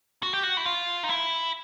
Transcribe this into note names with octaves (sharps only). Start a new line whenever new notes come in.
F#4
G4
F#4
E4
F4
D#4
E4